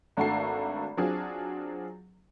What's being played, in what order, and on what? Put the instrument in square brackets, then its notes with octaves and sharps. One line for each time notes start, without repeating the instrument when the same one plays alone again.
[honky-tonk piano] G#1 A3 D4 F#4 A4 C7
F#3 C4 D4 F4 G#4